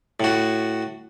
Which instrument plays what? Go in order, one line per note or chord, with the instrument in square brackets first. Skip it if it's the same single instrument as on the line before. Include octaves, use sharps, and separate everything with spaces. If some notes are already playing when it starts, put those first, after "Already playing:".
[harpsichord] A2 F#4